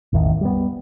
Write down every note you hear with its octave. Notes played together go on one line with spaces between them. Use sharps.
A1 E2 A2 D#3
G3 B3